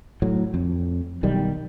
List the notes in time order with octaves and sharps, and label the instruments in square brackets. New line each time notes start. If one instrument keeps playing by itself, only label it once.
[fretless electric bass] A2 F#3
F2
B1 D#3 G3